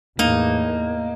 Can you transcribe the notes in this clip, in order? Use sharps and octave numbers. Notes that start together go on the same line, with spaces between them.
E2 A2 A#3 D#4